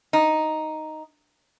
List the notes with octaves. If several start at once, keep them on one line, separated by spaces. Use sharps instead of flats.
D#4